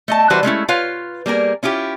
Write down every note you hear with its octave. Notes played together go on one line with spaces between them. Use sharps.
A3 D#5 A5
E3 G3 F#4 B4 C5
G#3 A3 C#4 E4
F4 B4 C#5 F5
G3 A#3 G#4 A#4
C#4 E4 F4 G4